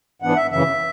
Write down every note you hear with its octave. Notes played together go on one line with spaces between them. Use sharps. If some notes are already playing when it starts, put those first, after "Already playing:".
G#2 E3 B3 D4 F#5
E5
F#2 C#3 E3 E5